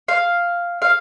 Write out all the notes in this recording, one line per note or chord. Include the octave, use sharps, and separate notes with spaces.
F5
F5